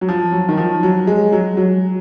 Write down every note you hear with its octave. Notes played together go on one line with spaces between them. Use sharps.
F#3
F3
F#3
D#3
F3
F#3
G#3
F#3
F#3